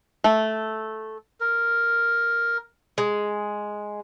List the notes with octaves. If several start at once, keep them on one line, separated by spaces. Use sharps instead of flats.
A3
A#4
G#3